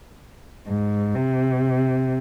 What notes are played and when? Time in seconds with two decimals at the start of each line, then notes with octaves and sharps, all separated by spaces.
0.68 G#2
1.15 C3